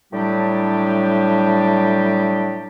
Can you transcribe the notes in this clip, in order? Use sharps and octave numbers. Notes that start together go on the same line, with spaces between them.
A2 F#3 G3 D4 G4